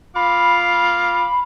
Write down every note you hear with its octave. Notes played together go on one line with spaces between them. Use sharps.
F4 F5 B5 D6